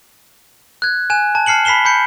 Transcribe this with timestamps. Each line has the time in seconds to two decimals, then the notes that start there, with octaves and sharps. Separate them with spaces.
0.82 F#6 G#6
1.10 G#5 F#6 E7
1.35 A5
1.46 A5 F6 C7 C#7 F#7
1.65 B5 B6 C7 E7 G7
1.85 B5 G6 C#7